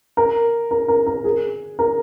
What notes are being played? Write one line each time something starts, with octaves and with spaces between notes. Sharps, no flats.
A#4
A#4
A#4
A#4
G#4
A#4